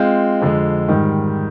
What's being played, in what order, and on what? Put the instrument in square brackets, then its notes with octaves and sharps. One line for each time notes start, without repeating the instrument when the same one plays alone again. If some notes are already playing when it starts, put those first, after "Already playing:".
Already playing: [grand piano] G#3 C4 F4
F2 D3 G#3
G#2 D#3 G3